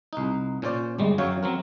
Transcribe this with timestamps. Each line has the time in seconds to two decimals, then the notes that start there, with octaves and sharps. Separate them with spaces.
0.13 C2 D#4
0.62 A#2 C#4 C5 D5
0.98 G1 G3 G#3
1.18 F#2 F#3 C#5 F5 G5
1.43 F#3 C4 A#4